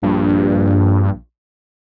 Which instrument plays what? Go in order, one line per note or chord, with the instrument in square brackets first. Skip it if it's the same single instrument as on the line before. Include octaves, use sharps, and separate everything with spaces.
[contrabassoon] A#1 [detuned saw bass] G2